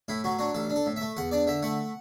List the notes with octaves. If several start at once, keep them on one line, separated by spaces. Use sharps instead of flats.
A2 E4
F#3 F#4
D4 F#4
A1 A4
D4
A4
A2
A3 E5
E2 F#5
D4 D5
D3 E5
A3 F#5